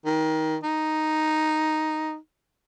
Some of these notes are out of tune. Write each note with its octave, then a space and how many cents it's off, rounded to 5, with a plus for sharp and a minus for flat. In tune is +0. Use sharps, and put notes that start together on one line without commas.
D#3 +20
D#4 +0